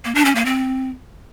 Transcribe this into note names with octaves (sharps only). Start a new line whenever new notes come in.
A#3
D4
C#4
A#3
C4